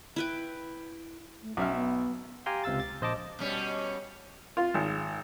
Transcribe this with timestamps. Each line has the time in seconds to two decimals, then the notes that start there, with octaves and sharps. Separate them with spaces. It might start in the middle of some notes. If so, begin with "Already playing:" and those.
0.16 E4 B4 G5
1.43 A3
1.57 B1 C#4 E5 F6
1.75 B3
2.46 G4 F5 G5 G#5 A#5 C6
2.64 C#2 C3 F5 E6 A6
2.80 A6
3.01 A#1 C5 D#5 A5 D6
3.39 B2 G3 C#4
4.57 F4
4.74 G#1